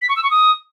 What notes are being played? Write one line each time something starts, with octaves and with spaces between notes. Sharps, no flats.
B6
C#6
E6
C#6
D#6